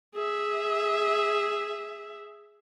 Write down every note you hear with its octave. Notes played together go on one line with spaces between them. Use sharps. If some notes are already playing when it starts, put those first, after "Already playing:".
G#4 E5